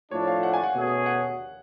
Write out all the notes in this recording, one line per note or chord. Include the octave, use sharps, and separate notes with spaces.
A2 F3 A3 D4 C#5
F5
F#5
G#5
F#5
B2 A3 C#4 G#4
F#5